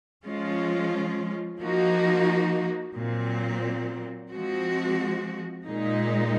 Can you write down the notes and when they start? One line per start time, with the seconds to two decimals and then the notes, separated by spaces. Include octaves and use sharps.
0.25 F3 G#3 C#4 F4
1.60 F3 A#3 D#4 F#4
2.94 A#2 F#3 C4
4.29 F3 G#3 C4 F#4
5.65 A#2 G#3 D#4